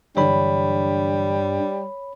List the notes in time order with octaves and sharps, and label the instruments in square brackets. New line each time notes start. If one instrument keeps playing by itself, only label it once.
[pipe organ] G2 [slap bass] D3 E3 F#3 [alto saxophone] G3 [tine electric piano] C#5 B5